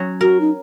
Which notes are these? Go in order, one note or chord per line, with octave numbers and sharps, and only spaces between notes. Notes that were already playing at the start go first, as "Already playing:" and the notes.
Already playing: F#3 C#4
F#4 A#4
D#4